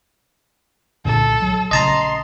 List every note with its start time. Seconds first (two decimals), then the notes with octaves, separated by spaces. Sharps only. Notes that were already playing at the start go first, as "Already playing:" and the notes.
1.05 C2 A#2 D3 A4
1.42 F#3
1.71 A#1 C#3 D#5 A5 A#5 C6